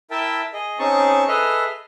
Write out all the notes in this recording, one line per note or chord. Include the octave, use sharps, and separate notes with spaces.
E4 A#4 E5 G5 A5
G#4 D#5
C4 C#4 D#4 G#4 A5 C#6
G#4 A4 B4 D#5 E5 F6